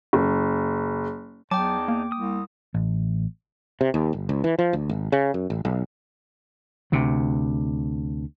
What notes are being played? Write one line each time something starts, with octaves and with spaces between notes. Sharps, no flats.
F#1
E2 F#3 D#4 G5 A5 D6
A#3
C2 D#6
A1
C3
D#2
G1
C#2
E3
F3
D2
G#1
C#3
F#2
A1
B1
D2 C3